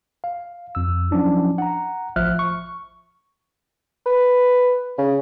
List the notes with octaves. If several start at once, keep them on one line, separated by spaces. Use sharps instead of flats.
F5
F2 E6
F3 F#3 C#4 D4 E4
F#5 A#5
A1 F3 E5 F6 F#6
C#6
B4
C#3